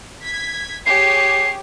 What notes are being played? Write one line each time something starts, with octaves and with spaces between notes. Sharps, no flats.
G#6 B6
G4 G#4 C#5 C7